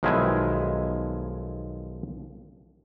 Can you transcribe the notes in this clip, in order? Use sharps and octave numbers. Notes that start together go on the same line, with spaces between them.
B1 D#3 F3 G#3 E4 G#5